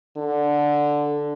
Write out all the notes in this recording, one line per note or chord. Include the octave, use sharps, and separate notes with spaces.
D3